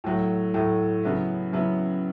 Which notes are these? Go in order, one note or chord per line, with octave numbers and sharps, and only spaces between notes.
A2 F#3 A3
A2 F#3 A3
C#3 F#3 B3 E4
C#3 F#3 B3 E4